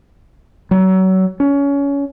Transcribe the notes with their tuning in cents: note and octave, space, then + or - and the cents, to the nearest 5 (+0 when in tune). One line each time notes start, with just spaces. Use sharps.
F#3 +30
C#4 +25